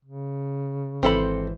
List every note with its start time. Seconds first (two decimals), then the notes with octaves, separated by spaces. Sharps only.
0.05 C#3
1.03 G#1 E3 C4 A4 C5 B5